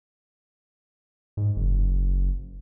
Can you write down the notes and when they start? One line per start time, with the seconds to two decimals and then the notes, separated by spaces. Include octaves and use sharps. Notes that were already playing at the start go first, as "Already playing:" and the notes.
1.37 G#2
1.56 F#1